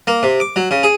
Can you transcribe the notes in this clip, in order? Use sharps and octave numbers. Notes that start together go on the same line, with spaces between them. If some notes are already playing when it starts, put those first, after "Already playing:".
A#3
C3
D6
F#3
C#3
G#4